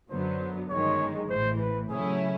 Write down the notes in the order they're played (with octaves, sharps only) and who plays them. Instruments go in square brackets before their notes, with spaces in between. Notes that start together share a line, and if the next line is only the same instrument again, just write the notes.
[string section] F#2 D3 F#3 B3 [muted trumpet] C5
[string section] G1 F#2 D#3 G#3 [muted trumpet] C#5
[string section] A1 A2 E3 [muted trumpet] C5
[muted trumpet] B4
[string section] C#3 F#3 A3 C#4 E4 [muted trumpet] G#4